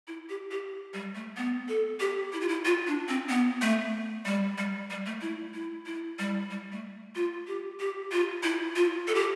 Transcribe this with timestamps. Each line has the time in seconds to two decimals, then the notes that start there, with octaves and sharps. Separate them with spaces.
0.08 E4
0.29 G4
0.51 G4
0.94 G3
1.15 A3
1.37 B3
1.69 A4
2.00 G4
2.33 E4
2.40 F4
2.48 E4
2.65 F4
2.87 D4
3.08 C4
3.29 B3
3.62 A3
4.25 G3
4.58 G3
4.90 G3
5.06 A3
5.21 E4
5.54 E4
5.86 E4
6.19 G3
6.51 G3
6.72 A3
7.15 F4
7.47 G4
7.80 G4
8.12 F4
8.43 E4
8.76 F4
9.08 A4
9.15 G4